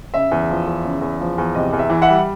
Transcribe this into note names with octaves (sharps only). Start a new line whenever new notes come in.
C#3 E5
E2
F3
E2
C#3
E2
F3
E2
C3 D#5
E2
E5
E3
E5 F#5
G3